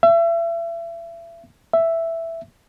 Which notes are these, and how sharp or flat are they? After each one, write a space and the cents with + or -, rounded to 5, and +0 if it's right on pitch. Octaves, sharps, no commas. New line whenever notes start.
E5 +35
E5 +5